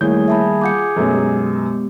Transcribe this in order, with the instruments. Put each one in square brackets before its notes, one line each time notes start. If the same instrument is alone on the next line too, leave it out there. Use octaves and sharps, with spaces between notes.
[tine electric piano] D#3 G3 A#3 [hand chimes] A3 E4 C#5 [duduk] G#4 [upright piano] G6
[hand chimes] E5 A5 B5
[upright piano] F4 F#5 [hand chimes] D6 G6 C#7
[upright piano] F#2 B2 F#3 [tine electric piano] A3 B3 A4
[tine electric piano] G#3 B3 G4